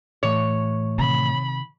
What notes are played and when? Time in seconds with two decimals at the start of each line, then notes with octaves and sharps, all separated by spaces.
0.23 A2 E3 A3 C#5
0.98 C3 D#3 B5